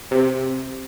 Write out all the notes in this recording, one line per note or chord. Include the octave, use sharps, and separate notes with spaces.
C3